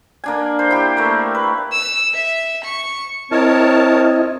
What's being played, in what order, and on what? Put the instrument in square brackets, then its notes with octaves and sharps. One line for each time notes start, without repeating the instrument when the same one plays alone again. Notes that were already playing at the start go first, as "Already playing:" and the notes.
[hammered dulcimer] A#3 D4 G#5
C5
E4 G4
A3 A#3
B4
[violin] E6
E5
C#6
[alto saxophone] C4 [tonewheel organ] E4 D#5 [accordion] A#4 C#5 A5